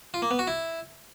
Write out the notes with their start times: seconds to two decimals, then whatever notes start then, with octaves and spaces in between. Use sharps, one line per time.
0.14 F4
0.22 A#3
0.31 B3
0.39 F#4
0.47 E4